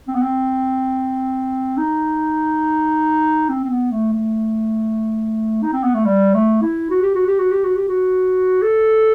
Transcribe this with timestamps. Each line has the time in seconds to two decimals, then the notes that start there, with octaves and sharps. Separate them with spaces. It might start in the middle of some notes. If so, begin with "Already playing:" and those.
0.08 C4
0.15 B3
0.23 C4
1.78 D#4
3.49 C4
3.65 C4
3.70 B3
3.91 A3
4.13 A3
5.63 D#4
5.73 C4
5.84 B3
5.94 A3
6.05 G3
6.34 A3
6.62 E4
6.90 F#4
7.02 G4
7.15 F#4
7.27 G4
7.39 F#4
7.51 G4
7.64 F#4
7.76 G4
7.88 F#4
8.62 A4